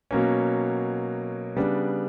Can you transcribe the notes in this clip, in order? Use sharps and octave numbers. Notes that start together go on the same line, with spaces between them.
B2 F#3 A#3 C#4
C#3 G3 B3 D4